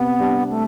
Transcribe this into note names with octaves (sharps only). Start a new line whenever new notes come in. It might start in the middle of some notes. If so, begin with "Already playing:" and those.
Already playing: C3 B3
G3 D4
A3